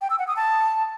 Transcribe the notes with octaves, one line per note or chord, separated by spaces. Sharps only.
G5
E6
F#5
D#6
A5